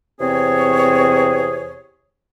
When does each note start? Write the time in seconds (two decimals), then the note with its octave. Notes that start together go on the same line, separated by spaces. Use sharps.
0.19 E2 C3 C4 G#4 C#5